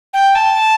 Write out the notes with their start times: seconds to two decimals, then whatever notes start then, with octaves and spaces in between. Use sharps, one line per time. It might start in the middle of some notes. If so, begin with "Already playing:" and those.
0.14 G5
0.35 A5